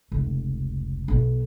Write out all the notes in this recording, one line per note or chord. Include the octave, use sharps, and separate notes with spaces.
F1 C#2
B1 B2